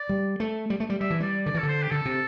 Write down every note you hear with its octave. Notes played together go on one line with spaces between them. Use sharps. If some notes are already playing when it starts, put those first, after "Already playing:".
Already playing: D5
G3
A3
G3
A3
G3
G3 E5
E3
G3 D5
D3 D5
E3
D3 A4
C5
G4
D3 A4
C3